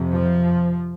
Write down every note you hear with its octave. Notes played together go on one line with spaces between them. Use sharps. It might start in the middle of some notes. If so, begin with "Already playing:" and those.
Already playing: F2 C3
F3